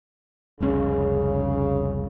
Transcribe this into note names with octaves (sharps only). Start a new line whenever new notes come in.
F1 C2 C#3 C#4